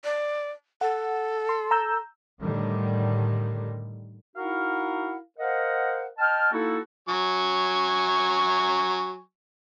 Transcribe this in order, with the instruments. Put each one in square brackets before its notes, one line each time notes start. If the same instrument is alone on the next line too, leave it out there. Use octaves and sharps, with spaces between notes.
[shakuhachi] D5
[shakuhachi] A4 [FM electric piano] F#5
[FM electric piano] C6
A#5 E6 G6
[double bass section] A2 D3 D#3 G3
[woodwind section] D#4 E4 F#4 A#4 F5 F#5
A#4 C5 D#5 F5 F#5
D#5 G5 A5 F6
A#3 D#4 E4 F#4 A4
[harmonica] F#3 G#5 C#6